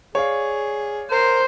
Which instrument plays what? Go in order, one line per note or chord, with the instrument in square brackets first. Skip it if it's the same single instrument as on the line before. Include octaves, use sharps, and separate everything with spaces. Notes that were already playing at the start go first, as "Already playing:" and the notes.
[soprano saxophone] G#4 [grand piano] C#5 D5 F5
[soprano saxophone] A#4 [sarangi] C5